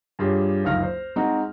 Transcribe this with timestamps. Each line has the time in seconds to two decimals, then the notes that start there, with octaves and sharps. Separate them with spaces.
0.19 G2 F4 G4 G#4 C#5
0.64 F#1 C#2 D#3 F5 F6 A#6
0.82 C5
1.16 G#3 C4 D#4 F#4